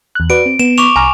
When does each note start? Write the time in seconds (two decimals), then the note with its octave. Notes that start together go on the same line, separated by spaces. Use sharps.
0.15 E2 F#6
0.30 F#4 B4 D5 D7
0.46 C4
0.59 B3 E7
0.78 C#6 D6 F7
0.96 C2 G#5 A#5 F6